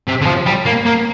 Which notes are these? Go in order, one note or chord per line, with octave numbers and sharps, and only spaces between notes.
C3
D3
F3
G3
A#3
A#3